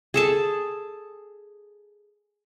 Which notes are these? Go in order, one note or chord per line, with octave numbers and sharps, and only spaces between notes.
G#4 A4 A5